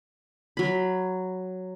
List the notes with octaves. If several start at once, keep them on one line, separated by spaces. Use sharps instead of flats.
F#3 B5